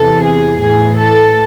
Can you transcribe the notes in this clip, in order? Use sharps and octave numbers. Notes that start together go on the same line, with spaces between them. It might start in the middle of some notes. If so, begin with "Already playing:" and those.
Already playing: E2 C3 E3 A4
G#4
A2 E3 G#4
A4